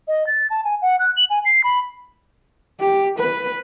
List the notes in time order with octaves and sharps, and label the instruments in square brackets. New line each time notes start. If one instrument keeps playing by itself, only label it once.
[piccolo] D#5
A6
A5
G#5
F#5
F#6
F#7
G#5
C7
B5
[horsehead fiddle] G4
B4